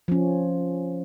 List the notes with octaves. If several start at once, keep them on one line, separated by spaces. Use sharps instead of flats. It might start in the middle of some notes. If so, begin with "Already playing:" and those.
F3 C#4